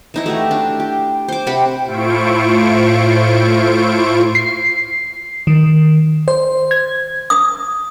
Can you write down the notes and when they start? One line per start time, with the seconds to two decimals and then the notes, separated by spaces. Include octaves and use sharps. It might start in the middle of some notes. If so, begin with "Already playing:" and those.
0.14 E3 D#4 E4
0.26 A3 F#4 G4
0.51 D4
0.80 G4
1.28 C5 D6
1.47 C3 G4 F#5 B5
1.85 A2 E4 F4 C5 C#6 D7
4.35 C7
5.47 D#3
6.28 C5
6.71 G#6
7.30 D#6